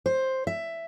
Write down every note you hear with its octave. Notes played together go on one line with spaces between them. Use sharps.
C5
E5